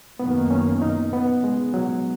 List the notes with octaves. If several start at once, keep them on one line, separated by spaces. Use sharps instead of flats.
F#2 D#3 A#3 B3
C#4
D#4
B3
G#3
F#3